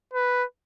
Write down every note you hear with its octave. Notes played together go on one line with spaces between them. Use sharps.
B4